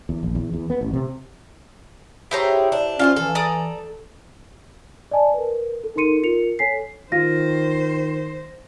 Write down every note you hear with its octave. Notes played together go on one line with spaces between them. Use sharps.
E2
A#1
E2
E2
B3
A1
C3
E4 G4 G#4 C5 C#5 A#5
D4
C#4 F4 F#4 C5 F5
E3 A4
D5 A#5 D#6
D5 D#5 G#5 A5
A#4 B4
A4
D#4 A4 A#4 C6 C#7 D#7
F4 A#4 C#7 F7
A4 C#5 G#5 B6 C7
D#3 F4 C5 A#6